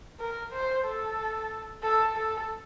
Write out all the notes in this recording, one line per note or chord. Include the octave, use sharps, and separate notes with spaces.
A#4
C5
A4
A4
A4